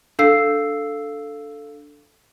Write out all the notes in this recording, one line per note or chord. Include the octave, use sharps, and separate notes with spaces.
D4 A4 F5 E6 C7